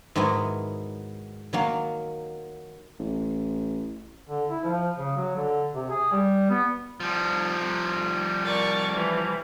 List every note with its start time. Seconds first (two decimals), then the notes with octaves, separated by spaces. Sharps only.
0.15 G#2 D#3 F#3 B3 E4
1.53 D#3 F#3 A#3
2.99 A1
4.29 D3
4.50 E4
4.64 F3
4.98 C#3
5.16 F#3
5.36 D3
5.75 C3
5.90 G#4
6.12 G3
6.50 B3
7.00 F3 G3
8.44 A#4 D5 C#6
8.93 E3